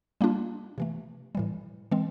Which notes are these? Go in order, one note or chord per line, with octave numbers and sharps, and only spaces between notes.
G3 A#3 D4 F4
C3 E3 A3
A2 E3 G3
E3 G#3 C4